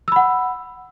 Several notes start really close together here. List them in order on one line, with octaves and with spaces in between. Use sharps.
E6 B5 F#5